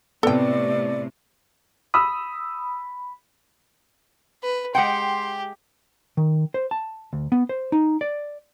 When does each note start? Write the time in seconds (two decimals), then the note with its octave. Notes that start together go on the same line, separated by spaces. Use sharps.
0.23 A2 C3 B3 A4 D5 G5
1.94 B5 D#6 E6
4.43 B4
4.75 G#3 G4 F#5 G5 C6
6.17 D#3
6.54 C5
6.71 A5
7.13 D2
7.32 B3
7.49 C5
7.72 D#4
8.01 D5